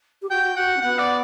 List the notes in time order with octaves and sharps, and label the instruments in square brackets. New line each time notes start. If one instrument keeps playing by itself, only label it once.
[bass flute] G4
[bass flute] F#4 [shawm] G5
[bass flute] F#4 [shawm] F#5
[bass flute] C#4
[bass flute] B3 [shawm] F#5
[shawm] D5